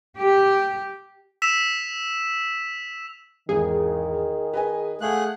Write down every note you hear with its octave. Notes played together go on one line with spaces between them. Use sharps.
G4
E6 B6 E7 F7
G#1 E2 D#3 G#4
B4 D#5 G#5
A3 G#4 F5 F#5 F#6